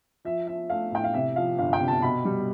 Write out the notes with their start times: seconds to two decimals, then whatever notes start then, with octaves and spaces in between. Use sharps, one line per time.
0.25 F3 E5
0.47 F3 E5
0.70 A3 F5
0.91 A2 G5
1.04 F5
1.14 C3 E5
1.36 F3 F5
1.58 G1 F5
1.73 G5
1.80 C3
1.88 A5
2.02 B2 B5
2.25 G3